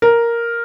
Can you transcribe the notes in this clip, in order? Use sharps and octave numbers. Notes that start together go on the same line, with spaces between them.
A#4